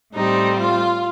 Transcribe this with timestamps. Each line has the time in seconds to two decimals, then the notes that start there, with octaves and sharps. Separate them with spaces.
0.14 A2 G3 C4 D#4
0.59 F4